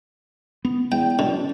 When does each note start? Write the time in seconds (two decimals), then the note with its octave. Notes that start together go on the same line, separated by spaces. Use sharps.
0.65 B3
0.92 E2 G5
1.19 F#2 D3